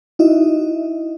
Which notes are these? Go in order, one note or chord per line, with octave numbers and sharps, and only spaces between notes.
D#4 E4 F#4 D#5 E5